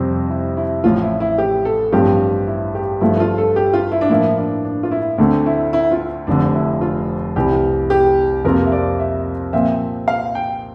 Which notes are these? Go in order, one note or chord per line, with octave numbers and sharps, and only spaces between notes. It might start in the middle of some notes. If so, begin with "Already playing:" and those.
Already playing: F2 C3 G3 C4
E4
E4
A1 A2 F3 F4
E4
E4
G4
A4
A1 G2 F3 C4 G4
E4
G4
G2 F3 A3 E4
F4
A4
G4
F4
E4
D4
A2 F3 A#3 E4
D4
D4
F4
E4
D2 D3 A3 C4 D4
E4
E4
F4
F1 F2 D3 D4
E4
F4
C2 C3 E3 G4
G4
F2 C3 F3 A#3 F4 A#4
E5
D5
E5
A#2 F3 C4 E5
F5
G5